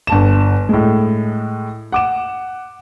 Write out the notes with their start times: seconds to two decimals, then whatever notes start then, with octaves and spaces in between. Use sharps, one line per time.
0.07 G1 A5 E7
0.69 A2 G#3
1.92 F#5 D6 E7